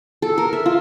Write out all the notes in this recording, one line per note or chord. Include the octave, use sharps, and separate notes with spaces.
A4
A#4
E5
F4